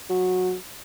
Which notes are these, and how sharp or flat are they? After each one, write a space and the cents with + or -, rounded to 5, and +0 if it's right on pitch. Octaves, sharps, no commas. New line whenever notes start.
F#3 -15